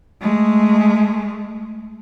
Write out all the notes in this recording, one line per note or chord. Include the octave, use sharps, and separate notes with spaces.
G#3 A3